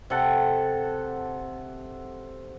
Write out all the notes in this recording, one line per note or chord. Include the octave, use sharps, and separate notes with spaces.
C3 A4 F#5